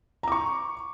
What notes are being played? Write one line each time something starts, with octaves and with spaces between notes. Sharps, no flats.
A#5 C#6 D6